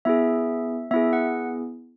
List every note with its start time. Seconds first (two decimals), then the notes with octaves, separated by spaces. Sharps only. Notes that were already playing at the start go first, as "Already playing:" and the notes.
0.05 B3 E4 G#4 E5
0.91 B3 E4 G#4 E5
1.13 F#5